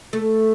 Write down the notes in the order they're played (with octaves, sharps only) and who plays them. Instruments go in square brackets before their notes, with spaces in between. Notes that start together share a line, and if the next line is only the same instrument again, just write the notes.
[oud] A3